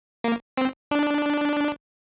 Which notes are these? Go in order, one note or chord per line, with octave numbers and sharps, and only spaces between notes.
A#3
C4
D4